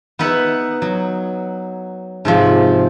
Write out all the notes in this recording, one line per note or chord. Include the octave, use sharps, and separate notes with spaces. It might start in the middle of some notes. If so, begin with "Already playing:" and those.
B3 D#4 B4 E5 F#5
F#3
G#2 C3 F3